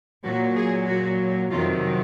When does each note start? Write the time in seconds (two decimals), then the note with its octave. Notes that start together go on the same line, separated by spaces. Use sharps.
0.25 A#2 F#3 F#4
0.56 G#4
0.88 F#4
1.51 F2 C3 D#3 F#3 F4